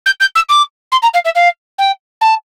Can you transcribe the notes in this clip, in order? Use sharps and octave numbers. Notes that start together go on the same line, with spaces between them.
G6
G6
E6
D6
C6
A#5
F5
E5
F5
G5
A5